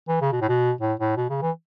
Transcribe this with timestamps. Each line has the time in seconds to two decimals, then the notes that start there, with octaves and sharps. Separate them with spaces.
0.08 E3
0.21 C#3
0.32 B2
0.41 A2
0.49 B2
0.81 A2
0.99 A2
1.17 B2
1.30 C#3
1.42 E3